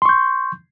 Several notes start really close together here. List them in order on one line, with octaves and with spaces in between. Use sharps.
C6 C#6 G6